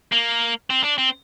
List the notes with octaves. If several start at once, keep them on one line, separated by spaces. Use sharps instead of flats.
A#3
C4
D4
C4